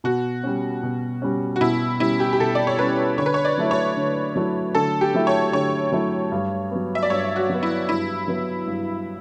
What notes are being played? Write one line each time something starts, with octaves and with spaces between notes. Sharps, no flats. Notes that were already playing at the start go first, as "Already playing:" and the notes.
B2 F#4
G3 C#4
B2
G3 C#4
F#4
B2 E4
G3 C#4 E4
G4
G4
B2 A4
D5
C#5
G3 C#4 B4
D3 C#5
B4
C#5
D5
F#3 A3 E4
C#5
D3
F#3 A3 E4
D3 A4
G4
F#3 A3 E4
C#5
D3 C#5
F#3 A3 E4
G2
F#3 B3
E5
D5
G2 C#5
F#4
F#3 B3
E4
G2 E4
F#3 B3
G2